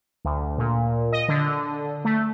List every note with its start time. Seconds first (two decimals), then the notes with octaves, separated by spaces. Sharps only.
0.25 D2
0.58 A#2
1.12 D#5
1.28 D3
2.05 A3